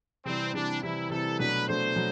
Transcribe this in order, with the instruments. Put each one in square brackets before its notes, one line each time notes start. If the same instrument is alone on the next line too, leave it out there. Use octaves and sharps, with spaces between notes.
[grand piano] C3 E3 G3 [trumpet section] C4
[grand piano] C3 E3 G3 [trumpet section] D4
[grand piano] C3 E3 G3 [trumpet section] E4
[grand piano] C3 E3 G3 [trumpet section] A4
[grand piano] B2 F#3 A3 D4 [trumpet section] B4
[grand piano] B2 F#3 A3 D4 [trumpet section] C5
[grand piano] B2 F#3